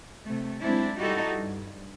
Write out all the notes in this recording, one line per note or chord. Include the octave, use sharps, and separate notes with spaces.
C3 A3
F#3 G#3 C4 D4 E4
G3 D#4 E4 F#4 G4 A4
G2